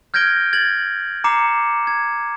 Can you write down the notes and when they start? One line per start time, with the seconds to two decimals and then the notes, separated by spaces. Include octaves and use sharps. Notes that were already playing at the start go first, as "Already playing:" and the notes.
0.14 F6 G6 G#6 A#6 D7 G7
0.53 G#6 A6 F#7
1.24 A#5 D6 C7 C#7 E7
1.87 G#6